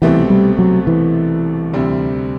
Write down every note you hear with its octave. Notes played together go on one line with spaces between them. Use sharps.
C2 B2 E3 A3 C4 G4
G3
F#3
E3
D2 C3 G3 C4